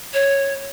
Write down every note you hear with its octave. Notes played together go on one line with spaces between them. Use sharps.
C#5